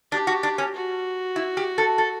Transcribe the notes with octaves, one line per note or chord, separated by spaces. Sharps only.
D4 G4
F#4
D4
C#4
F#4
E4
G4
A4
A4